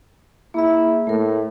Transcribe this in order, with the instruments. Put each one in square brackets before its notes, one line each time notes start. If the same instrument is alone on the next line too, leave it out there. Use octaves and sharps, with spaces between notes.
[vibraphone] A#3 G#4 E5 [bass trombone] E4
[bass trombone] A2 [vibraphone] A3 A#4